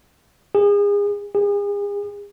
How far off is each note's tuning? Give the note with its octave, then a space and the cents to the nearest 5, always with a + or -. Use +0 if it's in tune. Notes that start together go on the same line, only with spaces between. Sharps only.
G#4 -35
G#4 -40